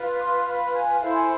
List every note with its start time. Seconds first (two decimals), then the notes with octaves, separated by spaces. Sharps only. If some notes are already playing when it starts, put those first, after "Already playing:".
Already playing: F4 B4
0.18 D6
0.23 C6
0.49 B5
0.75 G#5
1.00 E4 A4 C5 F5
1.13 G#5